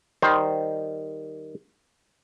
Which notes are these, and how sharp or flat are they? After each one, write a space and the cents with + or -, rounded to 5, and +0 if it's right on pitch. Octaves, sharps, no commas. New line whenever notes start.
D#3 -5 G3 -15 C5 +0